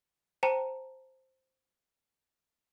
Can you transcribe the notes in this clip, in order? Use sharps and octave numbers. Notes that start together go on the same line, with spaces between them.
C5 G5 A5 A#5